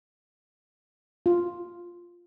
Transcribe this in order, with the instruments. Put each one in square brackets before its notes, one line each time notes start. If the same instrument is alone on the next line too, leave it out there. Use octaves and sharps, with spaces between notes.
[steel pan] F4